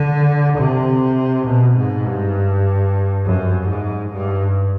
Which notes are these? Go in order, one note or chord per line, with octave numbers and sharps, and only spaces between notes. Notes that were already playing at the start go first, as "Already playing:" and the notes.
Already playing: D3
C3
B2
G#2
G2
F#2
G#2
G2